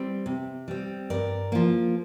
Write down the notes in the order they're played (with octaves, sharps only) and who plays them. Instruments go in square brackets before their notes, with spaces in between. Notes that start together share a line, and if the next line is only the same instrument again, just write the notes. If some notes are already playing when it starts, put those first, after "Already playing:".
Already playing: [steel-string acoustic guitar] G3 C4
C3
G3 C4
G2 A#4 D5
F3 A#3